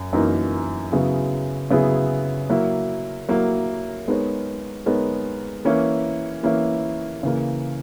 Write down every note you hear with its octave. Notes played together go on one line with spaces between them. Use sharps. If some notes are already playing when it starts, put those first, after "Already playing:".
Already playing: F#2
F#2 E3 A#3 D#4
C#3 F#3 B3 E4 G#4
C#3 F#3 B3 E4 G#4
F#3 A#3 E4
F#3 A#3 E4
G#3 B3 D#4 A#4 C#5
G#3 B3 D#4 A#4 C#5
E3 A#3 C#4 E4
E3 A#3 C#4 E4
C#3 E3 A#3